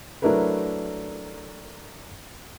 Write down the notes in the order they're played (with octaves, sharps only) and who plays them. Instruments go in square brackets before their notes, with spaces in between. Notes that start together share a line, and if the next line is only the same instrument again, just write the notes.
[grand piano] F#3 A3 D4 E4 A#4 B4